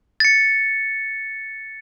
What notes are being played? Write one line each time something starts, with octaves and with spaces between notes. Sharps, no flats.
A6 C#7